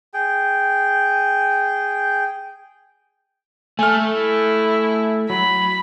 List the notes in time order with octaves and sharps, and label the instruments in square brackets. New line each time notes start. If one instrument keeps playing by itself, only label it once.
[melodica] G#4 G5
[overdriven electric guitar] A3 A4 [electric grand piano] G#5 F6
[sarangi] E4
[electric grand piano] F#3 [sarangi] B5